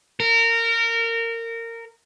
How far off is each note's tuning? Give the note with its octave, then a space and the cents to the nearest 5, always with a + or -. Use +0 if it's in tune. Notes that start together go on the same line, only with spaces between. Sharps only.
A#4 -20